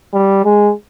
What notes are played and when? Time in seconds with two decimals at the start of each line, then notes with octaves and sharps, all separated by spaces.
0.14 G3
0.44 G#3